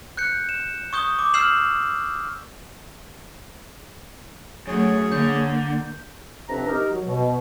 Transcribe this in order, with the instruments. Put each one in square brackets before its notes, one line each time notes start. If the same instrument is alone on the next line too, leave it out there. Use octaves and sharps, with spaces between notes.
[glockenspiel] F#6 G6 C#7
E7
C#6 D#6 G6 G7
D6
E6 F6 G6 C7 E7 F#7
[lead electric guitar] F#2 [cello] F#3 A3 [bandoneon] G#4 C#5
[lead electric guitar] D3 [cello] A#3 [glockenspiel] G6
[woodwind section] F2 C3 C4 D4 B4 A#5
D#4 G4 A#4
F#3
B2